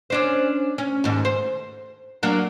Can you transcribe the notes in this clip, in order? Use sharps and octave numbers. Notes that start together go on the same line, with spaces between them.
C#4 D4 C5
C#4
D#2 G#2
C5
F#3 A#3 D4